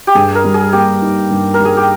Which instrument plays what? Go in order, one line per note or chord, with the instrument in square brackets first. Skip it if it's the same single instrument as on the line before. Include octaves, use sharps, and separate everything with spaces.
[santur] G4
[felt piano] G2 [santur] G#4
[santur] A#4
[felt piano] G3
[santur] G#4
[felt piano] A#3 [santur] G4
[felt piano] D#4
G2
[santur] A#4
[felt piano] G3
[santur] G#4
G4